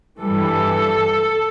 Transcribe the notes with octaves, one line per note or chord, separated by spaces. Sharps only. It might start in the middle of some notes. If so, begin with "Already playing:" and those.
G2 E3 G3 A4